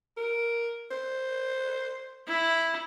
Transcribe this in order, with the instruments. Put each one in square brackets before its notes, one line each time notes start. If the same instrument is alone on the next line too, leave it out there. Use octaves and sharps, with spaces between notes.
[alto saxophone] A#4
C5
[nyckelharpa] E4